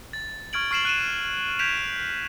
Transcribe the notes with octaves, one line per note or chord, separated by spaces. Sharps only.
A6
C#6 F6 G#6 D7 F#7
C#6 F6 C7 D7 E7 F#7
F#6 D#7 E7
G6 G#6 B6 D7 E7 F7